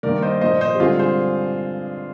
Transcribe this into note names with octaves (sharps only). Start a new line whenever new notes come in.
G2 D#3 A#3 A#4 D5
C5 D#5
A#2 F3 A#3 C5 D#5
C5 D#5
G4
G2 D3 G#3 C4 F4 G#4
G#4 C5